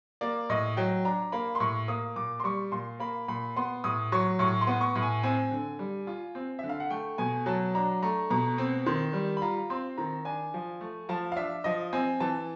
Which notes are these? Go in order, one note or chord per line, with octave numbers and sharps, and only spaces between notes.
A#3 D5
A2 D#5
F#3 G5
D4 A#5
A#3 B5
C6
A2 C#6
A#3 D#6
A#2 D6
C6
G3 C#6
A#2 C6
A#3 B5
A#2 B5
B3 C6
A2 D#6
F#3 C#6
A2 C#6
C6
B3
C#6
A2
G#5
C4 G#5
D3
G3
F4
C4
D3 E5
F5
F#5
A3 G5
B2 G#5
F#3 A5
D4 A#5
A3 A#5
B2 A#5
C4
D#3 C6
G3
B5
F4 A#5
C4 C6
D#3 A#5
D4 G#5
F3
A3
F3 A5
F5
D4 E5
F3 D#5
C4 G#5
E3 A5